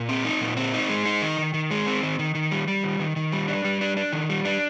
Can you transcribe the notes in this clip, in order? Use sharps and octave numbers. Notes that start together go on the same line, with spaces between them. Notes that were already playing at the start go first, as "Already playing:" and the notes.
Already playing: A#2
C4
D#4
A#2
C4
D#4
G#3
D#4
D#3
D#3
D#3
G#3
C4
D#3
D#3
D#3
G3
G3
D#3
D#3
D#3
G3
D4
G3
D4
D4
D#3
G3
D4